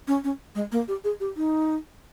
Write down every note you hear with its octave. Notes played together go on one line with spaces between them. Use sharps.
C#4
C#4
G#3
A#3
G4
G#4
G4
D#4